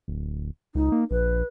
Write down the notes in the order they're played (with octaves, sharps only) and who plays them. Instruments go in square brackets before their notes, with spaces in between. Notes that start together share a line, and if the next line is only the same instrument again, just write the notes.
[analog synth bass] D1
[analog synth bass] C#2 [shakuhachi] D#4
[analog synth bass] A#3
[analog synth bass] A#1 [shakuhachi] B4